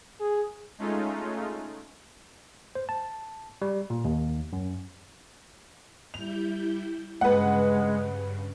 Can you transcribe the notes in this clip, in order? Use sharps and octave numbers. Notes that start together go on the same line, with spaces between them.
G#4
G#3 A3 C#4 D#4 F4
C5
A5
G3
A#2
D#2
F#2
G3 E4 G6 F7
G2 C#3 G#3 B4 F#5